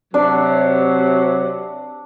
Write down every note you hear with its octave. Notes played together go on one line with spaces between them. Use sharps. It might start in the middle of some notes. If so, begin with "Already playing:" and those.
C3 F#3 D4